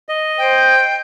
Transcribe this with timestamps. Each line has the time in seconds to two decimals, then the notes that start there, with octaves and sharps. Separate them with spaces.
0.09 D#5
0.38 C5 G5